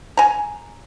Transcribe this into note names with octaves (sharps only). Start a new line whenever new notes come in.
G#5 A#5